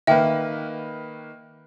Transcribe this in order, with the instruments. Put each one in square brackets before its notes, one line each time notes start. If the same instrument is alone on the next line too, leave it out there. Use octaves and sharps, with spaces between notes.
[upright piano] D#3 A#3 B4 [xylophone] E5 G5